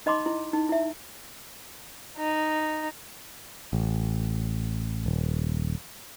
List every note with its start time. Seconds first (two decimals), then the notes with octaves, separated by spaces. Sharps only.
0.06 D#4 D#5 B5 C6 D6
0.26 E4
0.53 D#4
0.69 E4 E5
2.17 D#4
3.73 A1
5.06 D#1